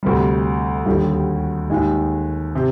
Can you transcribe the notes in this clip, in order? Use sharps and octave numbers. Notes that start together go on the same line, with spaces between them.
D2 C3 G3
D#2 D3 G3
D#2 D#3 G#3
C3